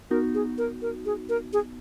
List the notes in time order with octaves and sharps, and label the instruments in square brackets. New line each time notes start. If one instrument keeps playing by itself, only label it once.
[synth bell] B3 D#4 F#4 [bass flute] A#4
[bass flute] G#4
A#4
A#4
G#4
A#4
G#4